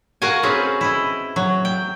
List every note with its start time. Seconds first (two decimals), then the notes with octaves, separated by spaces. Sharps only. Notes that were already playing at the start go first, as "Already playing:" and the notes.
0.22 F#4 A#4 F5 F#5 G#5
0.43 C4 C#4 G#4 B4
0.81 E4 D#5
1.36 F#3
1.65 G5